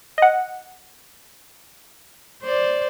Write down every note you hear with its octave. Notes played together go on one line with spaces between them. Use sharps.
D#5 F#5
C5 D5